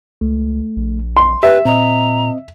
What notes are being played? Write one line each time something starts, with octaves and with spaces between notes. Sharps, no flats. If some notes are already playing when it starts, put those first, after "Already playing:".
C#2 A3
A#1
C6
G4 B4 E5
A#2 C4 D#5 A#5